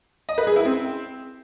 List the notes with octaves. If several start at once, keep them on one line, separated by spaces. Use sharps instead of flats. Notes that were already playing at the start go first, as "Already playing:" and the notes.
D#5
B4
G#4
E4
C4